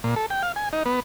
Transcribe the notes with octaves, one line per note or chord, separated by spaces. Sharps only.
A#2
A4
G5
F5
G#5
D#4
B3